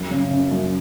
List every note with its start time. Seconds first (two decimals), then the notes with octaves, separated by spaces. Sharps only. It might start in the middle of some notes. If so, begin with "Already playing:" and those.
Already playing: F#2
0.11 C#3
0.31 C#3
0.51 F#2